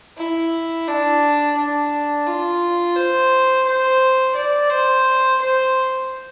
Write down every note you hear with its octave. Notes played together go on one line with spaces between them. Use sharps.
E4
D4
D4
F4
C5
C5
D5
C5
C5